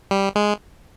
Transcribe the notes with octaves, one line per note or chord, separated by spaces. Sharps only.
G3
G#3